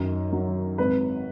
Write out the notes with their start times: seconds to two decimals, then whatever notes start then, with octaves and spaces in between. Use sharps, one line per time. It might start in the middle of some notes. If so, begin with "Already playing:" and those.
Already playing: F#2 D#3
0.32 F#3
0.78 G#1 B4